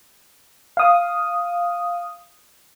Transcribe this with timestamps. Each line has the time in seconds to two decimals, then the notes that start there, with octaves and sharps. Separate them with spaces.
0.77 F5 D#6